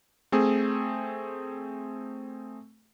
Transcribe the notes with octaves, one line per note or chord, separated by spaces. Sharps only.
A3 C4 G#4